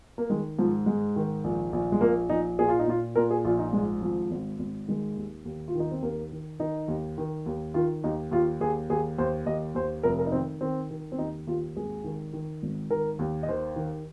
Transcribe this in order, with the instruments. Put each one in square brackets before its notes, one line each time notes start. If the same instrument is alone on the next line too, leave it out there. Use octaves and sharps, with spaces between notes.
[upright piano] A#3
D#3 G#3
G#2 F3
G#2 G#3
D#3
A#1
A#1
G#3
A#1 A#3
A#1 D#4
A#2 G#4
F4
D#4
A#2 F4
A#2 A#4
G#4
A#1 F4
D#4
G#2 G#3
G#1 F3
G#1
G#1
D#3 G#3
D#2
D#2
F4
D#3
D#4
C4
D#2 A#3
D#3
D#3 D#4
D#2
D#3
D#2
D#3 F4
D#2 D#4
D#2 F4
D#2 G#4
D#2 G#4
D#2 C5
D#2 D#5
D#2 C5
F1 A#4
A#4
D#4
D#3 C4
D#3 C4
D#3
C4
D#2 D#4
D#2 F4
G#1 G#4
D#3
D#3
G#1
D#3 A#4
D#2
D#5
D#3 C5
D#3